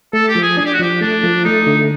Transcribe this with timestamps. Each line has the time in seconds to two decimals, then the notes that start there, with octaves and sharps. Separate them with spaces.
0.13 A3 A4
0.28 G4
0.35 F3
0.43 G#4
0.57 D4 G#4
0.65 G4
0.73 F#4
0.79 F3 G4
1.01 A3 D4
1.23 F3
1.45 A3 D#4
1.67 D3